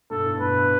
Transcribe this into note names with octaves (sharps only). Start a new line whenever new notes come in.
G2 B2 A4
A2
G2 B2 B4